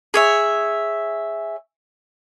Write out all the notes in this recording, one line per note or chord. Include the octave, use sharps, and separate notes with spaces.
G#4 C#5 E5